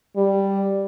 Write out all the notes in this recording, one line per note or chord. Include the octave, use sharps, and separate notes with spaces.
G3